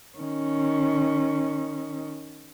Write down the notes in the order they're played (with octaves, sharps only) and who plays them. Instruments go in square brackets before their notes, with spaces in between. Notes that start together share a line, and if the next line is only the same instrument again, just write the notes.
[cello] D#3 C#4